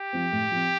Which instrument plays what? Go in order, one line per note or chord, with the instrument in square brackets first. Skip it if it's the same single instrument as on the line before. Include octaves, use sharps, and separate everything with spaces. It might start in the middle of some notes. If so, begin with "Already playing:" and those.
Already playing: [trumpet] G4
[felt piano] F3 C4
A2
F3 C4